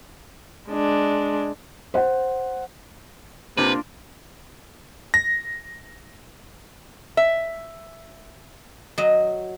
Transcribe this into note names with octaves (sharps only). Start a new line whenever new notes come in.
G#3 D4
C5 F#5
C3 A#3 D4 F4 B4
A#6
E5
F#3 D#5